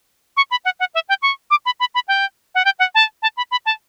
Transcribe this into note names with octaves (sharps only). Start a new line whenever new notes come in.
C#6
B5
F#5
F#5
E5
G5
C#6
D6
B5
B5
B5
G5
F#5
G5
F#5
A5
A5
B5
B5
A5